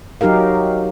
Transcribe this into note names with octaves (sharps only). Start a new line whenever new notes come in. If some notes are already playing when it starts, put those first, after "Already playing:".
F#3 D#4 G4 A#4 F5